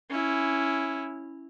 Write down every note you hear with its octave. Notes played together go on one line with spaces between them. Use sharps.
C#4 E4